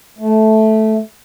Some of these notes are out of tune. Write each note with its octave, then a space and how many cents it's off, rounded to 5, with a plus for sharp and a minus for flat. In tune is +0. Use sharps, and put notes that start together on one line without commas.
A3 -10